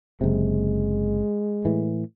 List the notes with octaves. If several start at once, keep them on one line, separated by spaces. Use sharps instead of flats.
F#1 C3 G#3
A2 E3